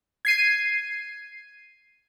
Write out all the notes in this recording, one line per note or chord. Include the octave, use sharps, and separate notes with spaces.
G#6 C7 D#7